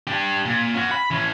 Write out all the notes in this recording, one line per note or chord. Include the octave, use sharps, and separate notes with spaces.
D4 G4
A#2
C#4 F#4
B5
E3 C#4